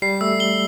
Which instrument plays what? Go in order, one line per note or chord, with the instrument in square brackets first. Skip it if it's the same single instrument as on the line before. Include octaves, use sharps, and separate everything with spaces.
[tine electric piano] G3 [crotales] C7
[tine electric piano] A3 [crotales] E6
[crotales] G7